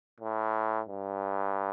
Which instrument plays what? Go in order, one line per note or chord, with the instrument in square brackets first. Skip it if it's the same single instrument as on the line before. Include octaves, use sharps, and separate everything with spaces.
[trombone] A2
G2